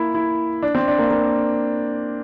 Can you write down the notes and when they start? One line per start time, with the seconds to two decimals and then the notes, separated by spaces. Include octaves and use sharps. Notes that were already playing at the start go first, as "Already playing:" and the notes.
Already playing: A#3 E4
0.14 E4
0.62 D4
0.75 C4
0.88 D4
0.99 A#3
1.11 A#3